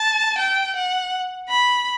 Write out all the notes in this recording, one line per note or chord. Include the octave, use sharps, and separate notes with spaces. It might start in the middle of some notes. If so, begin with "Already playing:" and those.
Already playing: A5
G5
F#5
B5